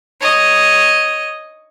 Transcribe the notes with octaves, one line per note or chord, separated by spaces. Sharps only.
C#5 D#5